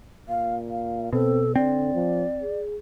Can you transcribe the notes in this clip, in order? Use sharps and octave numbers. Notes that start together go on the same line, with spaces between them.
A#2 F5
F5
B2 C4 A4
D3 C4 D5
F3
G#4